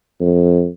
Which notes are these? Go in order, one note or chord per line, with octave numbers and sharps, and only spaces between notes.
F2